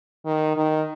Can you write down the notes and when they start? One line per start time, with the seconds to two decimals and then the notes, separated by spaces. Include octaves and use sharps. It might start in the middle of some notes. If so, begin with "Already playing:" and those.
0.25 D#3
0.56 D#3